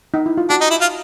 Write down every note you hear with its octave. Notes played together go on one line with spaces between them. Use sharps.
D#4
E4
F4
D4 F#4
D#4
E4
F4